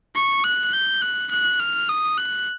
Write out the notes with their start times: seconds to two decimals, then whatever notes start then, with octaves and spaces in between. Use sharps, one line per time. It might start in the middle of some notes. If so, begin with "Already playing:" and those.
0.15 C#6
0.44 F#6
0.74 G6
1.02 F#6
1.31 F#6
1.60 F6
1.89 D#6
2.18 F#6